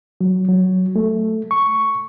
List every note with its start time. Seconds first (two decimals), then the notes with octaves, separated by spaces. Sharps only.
0.21 F#3
0.49 F#3
0.96 A3
1.51 C#6